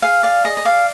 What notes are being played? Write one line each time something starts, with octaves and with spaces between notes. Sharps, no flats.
G#4 F5
D5 F5
G#4 D#5
D#5
D5 F5